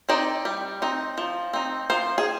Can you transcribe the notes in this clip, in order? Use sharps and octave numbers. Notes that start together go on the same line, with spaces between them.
C4 D#4 D5
G3
C4 D#4
F3
C4 D#4
F3 C5
G#4